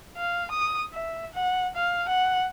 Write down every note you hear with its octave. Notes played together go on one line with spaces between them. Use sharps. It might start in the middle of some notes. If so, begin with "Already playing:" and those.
F5
D#6
E5
F#5
F5
F#5